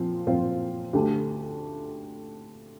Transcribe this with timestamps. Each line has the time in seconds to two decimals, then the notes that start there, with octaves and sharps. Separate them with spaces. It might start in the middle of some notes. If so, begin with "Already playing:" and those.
Already playing: A#2 F3 C4 F4
0.27 A#2 F3 C4 F4
0.93 D2 D3 A3 G4